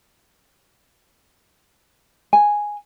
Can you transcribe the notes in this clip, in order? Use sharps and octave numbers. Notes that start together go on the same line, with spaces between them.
G#5